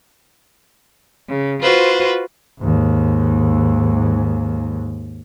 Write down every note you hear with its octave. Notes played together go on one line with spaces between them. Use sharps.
C#3
F4 F#4 B4 C5
D#2 G#2